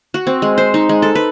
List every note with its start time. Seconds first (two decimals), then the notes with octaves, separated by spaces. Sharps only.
0.14 F#4
0.27 C4
0.42 G#3
0.58 C5
0.74 D#4
0.89 G#3
1.02 A4
1.15 B4